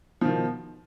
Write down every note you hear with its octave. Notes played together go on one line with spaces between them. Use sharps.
B2 D#3 F3